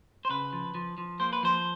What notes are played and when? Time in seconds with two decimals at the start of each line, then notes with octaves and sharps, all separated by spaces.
0.25 C5
0.30 C#3 B4
0.53 F3
0.75 F3
0.98 F3
1.20 A#3 C5
1.33 B4
1.43 F3 C5